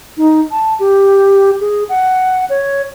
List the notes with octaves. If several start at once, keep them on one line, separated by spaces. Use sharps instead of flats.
D#4
A5
G4
G#4
F#5
C#5